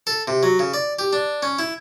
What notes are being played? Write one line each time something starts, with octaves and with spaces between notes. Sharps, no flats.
A4
C3
F#3
C#3
D5
G4
D4
C#4
E4